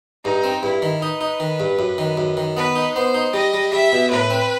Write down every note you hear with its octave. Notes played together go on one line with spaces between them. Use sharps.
G2 D#4
C4
G2 E4
D#3
D#4 B4
D#4
D#3
G2
F#2
D#3
F#2
D#3
B3 B4
D#4
B3 C5
D#4
G3 D#5
G3
G3 E5
B2
A2 B4
C4